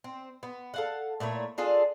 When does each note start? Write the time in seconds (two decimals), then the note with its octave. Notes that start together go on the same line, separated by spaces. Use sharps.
0.04 C4
0.43 B3
0.74 A4 F5 F#5
1.20 A#2 A3 E4 C#5
1.58 D4 F4 G#4 A4